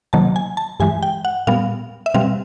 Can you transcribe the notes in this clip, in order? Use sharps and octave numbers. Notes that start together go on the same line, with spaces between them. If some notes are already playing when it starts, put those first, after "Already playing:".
C3 D#3 F#3 A#3 A5
G#5
A5
G2 E3 G#3 G#5
G5
F#5
A#2 G3 B3 F5
E5
B2 G3 C4 F5